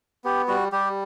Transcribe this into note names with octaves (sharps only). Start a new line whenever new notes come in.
B3 G4
G3 F#4
G3 G4